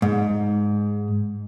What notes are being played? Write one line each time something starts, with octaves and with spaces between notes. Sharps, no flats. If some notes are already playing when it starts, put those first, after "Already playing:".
G#2